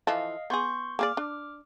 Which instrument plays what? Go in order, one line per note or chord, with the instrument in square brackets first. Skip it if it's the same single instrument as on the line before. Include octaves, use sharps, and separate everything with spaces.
[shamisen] E3 F3 A4 [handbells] D#5 F5
[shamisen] B3 G#4 [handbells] C6 C#6 G6
[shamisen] A#3 G#4 D5 [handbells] D6 F6
[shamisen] D4